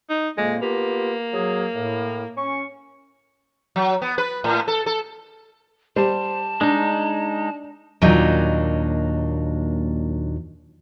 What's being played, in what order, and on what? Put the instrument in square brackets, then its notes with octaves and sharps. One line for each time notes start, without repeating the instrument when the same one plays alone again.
[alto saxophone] D#4
[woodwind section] F2 A#2 A#3 [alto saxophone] G#3
[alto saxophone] A#3 [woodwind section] B3 F4 G4
[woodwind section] F#3 G#4
A2
C#4 C#6
[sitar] F#3
B3
B4
A2
A4
A4
[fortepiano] G3 [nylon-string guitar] C5 [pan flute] A5
[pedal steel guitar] G#3 D#4 [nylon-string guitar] D4
[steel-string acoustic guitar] D#2 A#2 F#3 D4 D#4